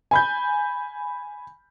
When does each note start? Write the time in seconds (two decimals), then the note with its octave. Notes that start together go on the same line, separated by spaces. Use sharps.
0.11 G#5 B5 G6